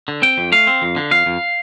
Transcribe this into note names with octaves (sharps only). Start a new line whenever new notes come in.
D3
C4 G5
F2
A3 F5
C4
F2
D3
F2 F5
F2